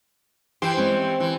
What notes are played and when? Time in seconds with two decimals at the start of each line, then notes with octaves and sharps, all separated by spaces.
0.62 E3 G4 C5 G5
0.77 G#3 C4 C#4
1.20 E3